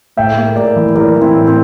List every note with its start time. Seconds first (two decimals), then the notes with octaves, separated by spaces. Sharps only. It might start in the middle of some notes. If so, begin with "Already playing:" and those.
0.17 A2 E5 G5
0.37 A#3
0.56 A2 A#4 D5
0.76 E3
0.95 E3 A#4 D5
1.15 E3
1.21 C4 E4
1.35 A2
1.48 C4